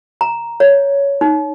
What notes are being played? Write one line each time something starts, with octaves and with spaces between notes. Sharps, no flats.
A#5
C#5
D#4